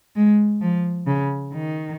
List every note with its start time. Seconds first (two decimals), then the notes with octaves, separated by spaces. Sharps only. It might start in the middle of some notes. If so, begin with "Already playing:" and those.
0.16 G#3
0.61 F3
1.07 C#3
1.53 D#3